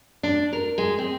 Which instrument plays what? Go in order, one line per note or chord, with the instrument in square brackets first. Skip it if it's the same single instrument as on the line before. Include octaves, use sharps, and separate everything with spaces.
[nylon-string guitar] D4
A#4
G#3
C4